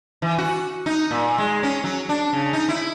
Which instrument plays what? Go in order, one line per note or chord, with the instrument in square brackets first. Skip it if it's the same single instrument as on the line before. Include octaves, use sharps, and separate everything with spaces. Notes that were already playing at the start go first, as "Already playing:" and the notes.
[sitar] E3
F#4
D#4
A#2
G#3
C#4
F#3
D4
C#3
D#4
E4